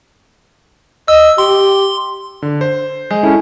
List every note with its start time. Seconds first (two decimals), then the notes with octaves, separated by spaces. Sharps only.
1.08 D#5 E6
1.38 G4 C6
2.42 D3
2.61 C5
3.11 G#3
3.23 C#4 E4 A4